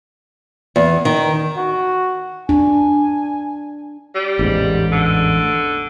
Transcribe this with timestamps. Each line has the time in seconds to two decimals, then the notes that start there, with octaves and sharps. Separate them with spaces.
0.76 E2
1.05 D#3
1.57 F#4
2.49 D4 G#5
4.15 G3
4.39 A1 E2 G#2
4.92 D3